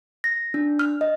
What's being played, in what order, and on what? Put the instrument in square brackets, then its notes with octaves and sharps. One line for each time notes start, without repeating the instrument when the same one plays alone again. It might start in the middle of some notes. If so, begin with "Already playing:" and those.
[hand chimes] A#6
D4
F6
D#5